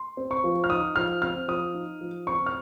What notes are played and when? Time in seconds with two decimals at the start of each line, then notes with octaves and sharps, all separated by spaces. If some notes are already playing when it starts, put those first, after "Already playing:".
Already playing: C6
0.17 C4
0.31 C#6
0.44 F3
0.64 F6
0.70 D#4 D#6
0.96 F3 F6
1.22 C4 F6
1.48 F3 D#6
1.74 D#4
2.01 F3
2.27 C4 C#6
2.46 F6